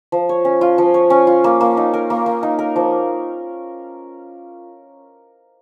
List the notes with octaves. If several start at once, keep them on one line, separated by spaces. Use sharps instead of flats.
F3
C#5
C#4
F4
F3
C#5
C#4
F4
A#3
A#3
D#4
A#4
A#3
A#3
D#4
A#4
F3